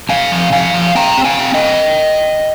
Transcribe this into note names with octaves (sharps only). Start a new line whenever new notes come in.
C3 F5 G#5
F3
F3 F5 G#5
F3
C4 G5 A#5
C4
F5 G#5
C4
D#5 G5